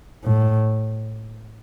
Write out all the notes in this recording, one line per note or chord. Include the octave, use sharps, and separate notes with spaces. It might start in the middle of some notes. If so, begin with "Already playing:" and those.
A2